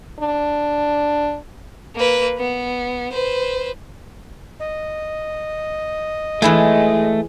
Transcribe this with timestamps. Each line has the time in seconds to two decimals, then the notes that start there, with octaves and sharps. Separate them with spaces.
0.19 D4
1.95 A#3 B4
2.37 B3
3.12 B4 C5
4.60 D#5
6.42 E3 G#3 A3 E4 G#4